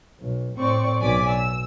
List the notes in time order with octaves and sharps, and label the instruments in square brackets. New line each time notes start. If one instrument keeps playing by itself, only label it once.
[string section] B1
A2 C4 D5 C#6
B1 D5 G#5 D6 B6
E6